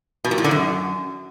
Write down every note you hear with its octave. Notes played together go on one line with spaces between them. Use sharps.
B2
A#2
A2
D3
F#2